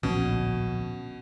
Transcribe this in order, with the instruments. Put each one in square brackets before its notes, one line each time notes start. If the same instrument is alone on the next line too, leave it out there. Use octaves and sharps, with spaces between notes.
[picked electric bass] D1 A#1 C#4 [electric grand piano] B2